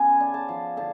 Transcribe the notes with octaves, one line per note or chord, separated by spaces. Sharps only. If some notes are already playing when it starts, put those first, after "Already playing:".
Already playing: C#3 B3 F#5 G#5
D4
A5
F3
D3 A5